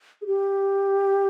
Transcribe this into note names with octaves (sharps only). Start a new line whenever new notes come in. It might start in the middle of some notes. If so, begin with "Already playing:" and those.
G#4
G4